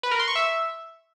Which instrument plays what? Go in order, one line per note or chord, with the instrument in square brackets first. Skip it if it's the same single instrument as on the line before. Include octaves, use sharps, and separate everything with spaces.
[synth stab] B4
A#4
C6
C#6
E5